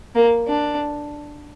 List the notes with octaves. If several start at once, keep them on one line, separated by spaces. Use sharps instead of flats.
A#3
D4